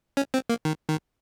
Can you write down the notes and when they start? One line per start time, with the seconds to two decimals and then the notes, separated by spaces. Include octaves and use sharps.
0.17 C#4
0.34 C4
0.50 A#3
0.65 D#3
0.89 D#3